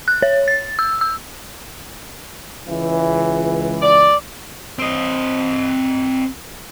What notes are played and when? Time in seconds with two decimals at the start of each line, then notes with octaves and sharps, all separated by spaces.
0.08 F#6
0.22 C#5
0.48 A6
0.79 E6
1.01 E6
2.68 C#2 E3
3.82 D5
4.79 C4 D#5